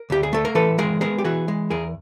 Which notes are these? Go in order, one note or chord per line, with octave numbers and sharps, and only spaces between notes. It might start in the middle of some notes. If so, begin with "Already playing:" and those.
Already playing: A#4
D2 G4
G#4
A3 A4
A#4
E3 A4 B4
G#3 G#4 A#4
B3 G#4 A#4
G4
E3 F#4 G#4
G#3
E2 G#4 A#4